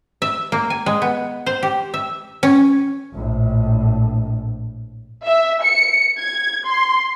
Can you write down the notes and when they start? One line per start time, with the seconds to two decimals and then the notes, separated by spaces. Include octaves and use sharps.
0.22 E5
0.52 A#3
0.70 G#5
0.86 G#3
1.02 B3
1.46 C5
1.63 G4
1.94 E5
2.43 C#4
3.14 A#1 A2
5.25 E5
5.63 C#7
6.20 G#6
6.67 C6